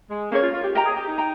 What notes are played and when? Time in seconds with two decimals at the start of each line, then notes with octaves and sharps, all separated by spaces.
0.10 G#3
0.32 A#3 C#4 G#4 C#5
0.42 F4
0.53 F4
0.64 G4
0.75 G4 A#4 D#5 G5 A#5
0.85 G#4
0.96 G4
1.07 D#4
1.18 G5 A#5